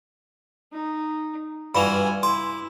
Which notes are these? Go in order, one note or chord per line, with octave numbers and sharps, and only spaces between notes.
D#4
G2 E3 F4 F#4 G#5 B5 F7
E4 C6 D6